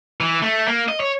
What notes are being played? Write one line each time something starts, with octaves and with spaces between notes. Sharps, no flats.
E3
A3
A#3
D#5
C#5